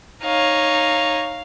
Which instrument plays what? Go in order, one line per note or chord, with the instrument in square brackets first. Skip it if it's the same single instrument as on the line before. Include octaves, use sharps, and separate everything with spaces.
[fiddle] D#4 C#5 [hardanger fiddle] F5